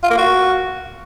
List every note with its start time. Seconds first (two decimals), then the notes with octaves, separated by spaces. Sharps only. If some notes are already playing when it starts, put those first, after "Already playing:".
0.03 F4
0.10 A#3
0.17 F#4